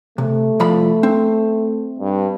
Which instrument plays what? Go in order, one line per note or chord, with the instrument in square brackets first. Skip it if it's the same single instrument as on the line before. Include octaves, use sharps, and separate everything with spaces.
[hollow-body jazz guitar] C3 [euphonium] A3
[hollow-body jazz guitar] C2 F3 B5
C4
[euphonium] G2